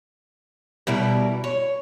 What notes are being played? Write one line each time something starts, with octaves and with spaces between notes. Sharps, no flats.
B2 G3 E4 A#4
C#5